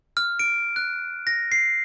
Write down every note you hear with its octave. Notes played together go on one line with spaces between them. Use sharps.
F6
D7
F#6
A#6
C7